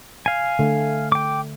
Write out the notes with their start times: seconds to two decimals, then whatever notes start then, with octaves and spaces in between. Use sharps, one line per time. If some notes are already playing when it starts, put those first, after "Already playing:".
0.26 F5 G#5
0.59 D3 A3
1.12 G5 D6